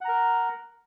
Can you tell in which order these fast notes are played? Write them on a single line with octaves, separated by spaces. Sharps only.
F#5 A#5 A#4